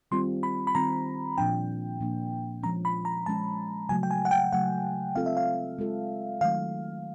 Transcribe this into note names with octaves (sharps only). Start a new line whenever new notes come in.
D#3 G3 C4 F4 C6
B5
B5
D#3 G3 C4 F4 A#5
A#2 F3 A#3 D4 G5
A#2 F3 A#3 D4
F3 G#3 C#4 A#5
B5
A#5
F3 G#3 C#4 A5
C#3 F#3 A3 G#5
G5
G#5
F#5
G5
C#3 F#3 A3 F#5
G#3 C4 F4 A4 F5
E5
F5
G#3 C4 F4 A4
D#3 F#3 A3 F5